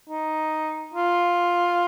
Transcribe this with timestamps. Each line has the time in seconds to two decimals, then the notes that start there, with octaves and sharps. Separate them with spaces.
0.10 D#4
0.94 F4